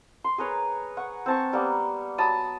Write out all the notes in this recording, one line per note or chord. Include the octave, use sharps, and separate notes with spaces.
C6
G#4 A#4 B4 C#5
F#5 C#6
C4 A5 C#6
G3 A#3 B3
F#3 A5 B5 D#6